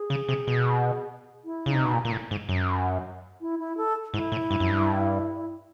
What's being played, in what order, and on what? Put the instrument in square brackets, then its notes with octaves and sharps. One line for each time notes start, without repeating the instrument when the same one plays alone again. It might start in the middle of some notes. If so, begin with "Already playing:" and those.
Already playing: [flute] G#4
[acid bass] C#3
C3
B2
[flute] E4
[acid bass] C#3 [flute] D#4
[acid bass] C3
B2
A#2
A#2
A2
G#2
F#2
[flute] E4
E4
A4
[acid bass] G#2 [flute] E4
[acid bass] A2
G2
F#2
G2